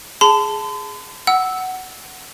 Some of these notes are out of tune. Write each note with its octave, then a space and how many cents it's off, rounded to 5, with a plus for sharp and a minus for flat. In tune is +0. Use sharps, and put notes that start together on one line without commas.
G#4 +0 A5 +0 C6 -45
F#5 +10 E6 -10